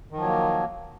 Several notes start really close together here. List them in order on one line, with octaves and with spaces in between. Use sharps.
D#3 F3 F#3 A#3